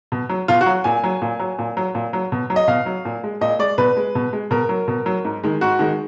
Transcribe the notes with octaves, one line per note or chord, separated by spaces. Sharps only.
B2
F#3
B2 F4
F#4
F#3
A#2 G#5
F#3
A#2
F#3
A#2
F#3
A#2
F#3
B2
F#3
D#5
B2 F5
F#3
A#2
G#3
A#2 D#5
G#3 D5
B2 B4
G#3
B2
G#3
B2 A#4
F#3
B2
F#3
G#2
D#3 G#3
G#2 F#4
D#3 G#3